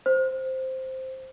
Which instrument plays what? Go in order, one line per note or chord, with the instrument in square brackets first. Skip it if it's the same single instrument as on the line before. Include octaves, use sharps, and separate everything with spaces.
[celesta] C5